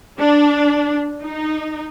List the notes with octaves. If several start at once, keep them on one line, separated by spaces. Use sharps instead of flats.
D4
D#4